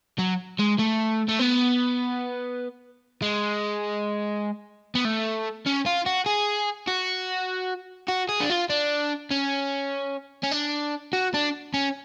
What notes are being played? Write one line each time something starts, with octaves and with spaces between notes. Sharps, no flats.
F#3
G#3
A3
A3
B3
G#3
B3
A3
C#4
F4
F#4
G#4
F#4
F#4
G#4
D4
F4
D4
C#4
C#4
D4
F#4
D4
C#4